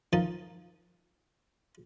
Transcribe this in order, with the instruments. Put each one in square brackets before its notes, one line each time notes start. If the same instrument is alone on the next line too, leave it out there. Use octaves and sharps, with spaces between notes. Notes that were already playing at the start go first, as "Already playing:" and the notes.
[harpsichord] D#3 F3 D#4 A5